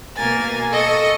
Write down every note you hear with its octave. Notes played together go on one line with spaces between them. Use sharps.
B2 A#3 A#4 G#5 A6
A4 D#5 C#6